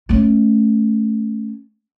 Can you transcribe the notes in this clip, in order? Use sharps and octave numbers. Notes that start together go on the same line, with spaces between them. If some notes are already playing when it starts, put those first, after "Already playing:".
A3 C#4